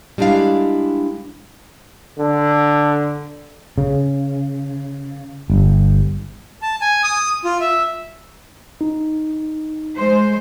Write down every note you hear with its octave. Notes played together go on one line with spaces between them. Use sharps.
G3 G#3 D4 E4 F5
D3
C#3
G1
A5
G#5
D#6
F4
E5
D#4
G#3 C5